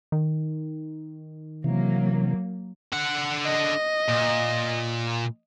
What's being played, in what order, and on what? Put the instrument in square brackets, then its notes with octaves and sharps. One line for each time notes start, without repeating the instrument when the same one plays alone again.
[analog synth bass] D#3
[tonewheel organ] C3 E3 [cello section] F#3 A#3
[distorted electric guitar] D3 F#5
[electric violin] D#5
[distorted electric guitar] A#2